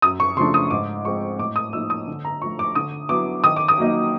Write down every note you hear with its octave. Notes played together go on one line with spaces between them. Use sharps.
F#2 D#6
C#6
C#3 F3 A3 D4 C6
D#6
G#2 D6
F3 G#3 C4 C#6
A2 D6
D#6
F3 A#3 D#4 E6
D#6
D3
A#5
F3 A3 C#6
D6
D3 D#6
F#3 B3 E4 D6
D#3 D#6
D6
D#6
F#3 A#3 D#4